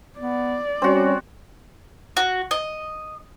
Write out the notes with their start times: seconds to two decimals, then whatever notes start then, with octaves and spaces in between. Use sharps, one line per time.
0.19 B3 D5
0.82 G3 C4 C#4 F#4
2.17 F#4
2.51 D#5